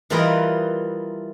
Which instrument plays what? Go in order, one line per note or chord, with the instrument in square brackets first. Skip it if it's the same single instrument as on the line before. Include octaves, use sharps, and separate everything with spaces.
[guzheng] E3 G3 F4 A#4 B4 D#5